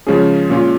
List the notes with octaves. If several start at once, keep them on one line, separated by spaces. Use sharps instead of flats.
C#3 F3 G#3 C#4 G#4
A#2 G#3 C#4 F4